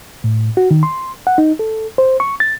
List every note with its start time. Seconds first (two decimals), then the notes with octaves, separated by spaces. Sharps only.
0.24 A2
0.57 F#4
0.71 D#3
0.83 C6
1.27 F#5
1.38 D#4
1.59 A4
1.98 C5
2.20 C#6
2.40 A6